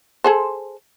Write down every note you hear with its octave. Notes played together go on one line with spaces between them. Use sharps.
G#4 A4 C5